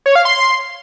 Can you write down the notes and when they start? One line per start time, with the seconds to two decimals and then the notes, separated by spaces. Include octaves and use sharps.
0.06 C#5
0.15 F5
0.25 C6